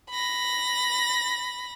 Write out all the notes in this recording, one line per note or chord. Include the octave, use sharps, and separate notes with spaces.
B5 A#6